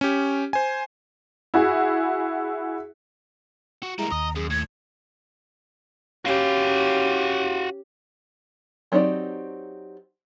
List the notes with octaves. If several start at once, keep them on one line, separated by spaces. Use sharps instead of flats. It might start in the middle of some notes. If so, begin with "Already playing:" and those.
C#4 G4
C5 G#5
E4 F#4 G#4
F#4
G3 G#3 A#3 E4 A#5
D#2 D#5
F#2 G#4
A2 G#6
C#4 F#4 G4 F5
F#3 C4 D#4 G4 D5